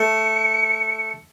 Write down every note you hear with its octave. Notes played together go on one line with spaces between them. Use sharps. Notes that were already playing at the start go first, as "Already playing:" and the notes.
Already playing: A3 C#7